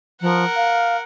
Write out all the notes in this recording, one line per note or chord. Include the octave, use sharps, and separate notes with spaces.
F3 A#4 F#5
F5